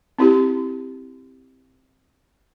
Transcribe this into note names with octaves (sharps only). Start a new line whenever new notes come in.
C4 E4 G4